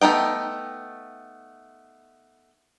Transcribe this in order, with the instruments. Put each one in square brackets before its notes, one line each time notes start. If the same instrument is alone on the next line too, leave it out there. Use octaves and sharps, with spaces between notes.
[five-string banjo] A3 B3 D#4 G5